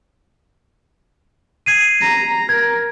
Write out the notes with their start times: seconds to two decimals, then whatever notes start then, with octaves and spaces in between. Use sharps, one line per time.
1.66 G#6 C7 D#7
2.01 A#5
2.49 A#4 G#6